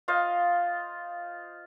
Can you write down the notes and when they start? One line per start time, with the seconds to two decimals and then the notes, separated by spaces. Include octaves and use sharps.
0.08 F4 C5 D#5 F5